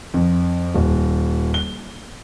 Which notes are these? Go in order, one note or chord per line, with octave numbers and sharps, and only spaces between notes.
F2
D#1
G7